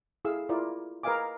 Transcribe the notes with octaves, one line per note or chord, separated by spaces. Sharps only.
E4 G#4 A4 F5 E6
E4 F4 A#4 D5
A#4 B4 D#5 F5 G#5 D6